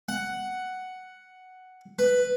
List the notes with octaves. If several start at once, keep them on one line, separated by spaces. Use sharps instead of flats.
F#5
B4